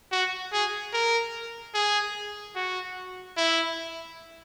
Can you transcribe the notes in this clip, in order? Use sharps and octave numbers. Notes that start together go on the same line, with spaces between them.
F#4
G#4
A#4
G#4
F#4
E4